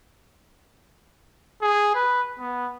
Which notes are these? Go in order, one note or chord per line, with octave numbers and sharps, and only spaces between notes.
G#4
B4
B3